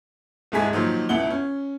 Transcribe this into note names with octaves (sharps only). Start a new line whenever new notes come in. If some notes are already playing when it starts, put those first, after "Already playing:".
D#1 C2 G#2 G#3 G#5 B6
A#2 D#3 F3 F#3
C#2 B2 E4 F#5 G7
C#4